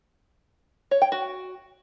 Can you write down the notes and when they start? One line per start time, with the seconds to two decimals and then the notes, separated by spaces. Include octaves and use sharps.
0.91 C#5
1.02 G5
1.12 F#4